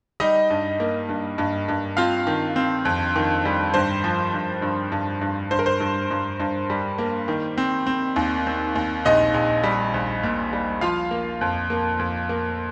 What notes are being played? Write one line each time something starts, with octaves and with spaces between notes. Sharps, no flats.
G3 D#4 D#5
G2
A#3
G2
G2
G2
C4 F4 F5
D#3
C4
F2
D#3
G3
G2 C5
F3
G2
G2
G2
G2
G2 C5
A#4
C5
G2
G2
G2
G3
A#3
D#3
C4
C4
D#2
C4
D#2
A#1 D#4 D#5
A#1
G3
A#1
A#2
G3
F3 F4 F5
A#3
F2
A#3
F2
A#3